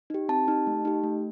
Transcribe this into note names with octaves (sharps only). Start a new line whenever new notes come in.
D#4 G4
C4 A5
D#4 G4
A3
D#4 G4
A3